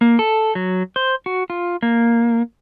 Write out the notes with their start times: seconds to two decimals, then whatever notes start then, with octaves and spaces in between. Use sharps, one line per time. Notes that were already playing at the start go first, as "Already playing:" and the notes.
0.01 A#3
0.19 A4
0.55 F#3
0.96 C5
1.26 F#4
1.50 F4
1.82 A#3